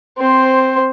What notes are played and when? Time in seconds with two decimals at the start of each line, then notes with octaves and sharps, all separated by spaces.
0.18 C4 C5